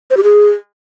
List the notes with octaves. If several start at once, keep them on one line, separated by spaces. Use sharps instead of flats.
C5
G4
G#4